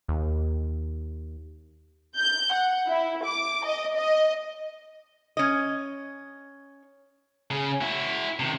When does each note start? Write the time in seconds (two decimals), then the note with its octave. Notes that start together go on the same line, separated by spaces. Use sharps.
0.08 D#2
2.16 G6
2.52 F#5
2.87 E4
3.25 D6
3.65 D#5
3.95 D#5
5.37 C#4 D#5
7.51 C#3 G#4
7.81 E4 F#4
8.39 C3 D#3